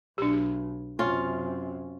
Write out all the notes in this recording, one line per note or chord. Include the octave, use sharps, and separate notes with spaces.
B1 D4 G4
F#2 C3 C#4 F4